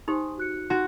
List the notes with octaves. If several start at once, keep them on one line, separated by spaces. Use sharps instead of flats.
D#4 G4 C5 G#5 C6 D#6
F#4 F#6 C#7
D#4 F#4 C6